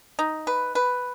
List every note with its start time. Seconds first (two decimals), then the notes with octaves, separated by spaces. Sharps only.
0.19 D#4
0.47 B4
0.75 B4